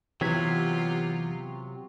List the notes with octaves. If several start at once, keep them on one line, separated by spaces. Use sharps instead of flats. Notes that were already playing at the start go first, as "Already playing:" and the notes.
C3 E3 F#3 B3 F4 G4 G#6 B6